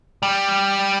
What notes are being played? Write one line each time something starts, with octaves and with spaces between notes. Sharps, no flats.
G3